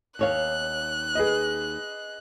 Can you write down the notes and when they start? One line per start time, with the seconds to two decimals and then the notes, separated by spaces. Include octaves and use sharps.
0.19 D#2 C#5 F5 F#6
1.15 G#4 B4 D#5